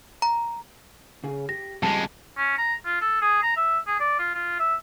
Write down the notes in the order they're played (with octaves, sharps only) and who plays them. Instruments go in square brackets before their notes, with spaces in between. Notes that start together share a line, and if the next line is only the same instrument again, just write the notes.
[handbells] A#5
[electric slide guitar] C#3 G#4
[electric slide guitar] G4 [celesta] A#6
[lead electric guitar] F2 G#3 [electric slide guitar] G3 [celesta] A5
[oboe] C#4
A#5
F4
A4
G#4
A#5
E5
G#4
D5
F4
F4
E5